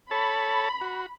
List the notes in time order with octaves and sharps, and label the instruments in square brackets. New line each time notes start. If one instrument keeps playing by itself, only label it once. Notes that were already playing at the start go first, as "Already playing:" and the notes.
[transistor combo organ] A4 C#5 A5 [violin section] B5
[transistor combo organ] F#4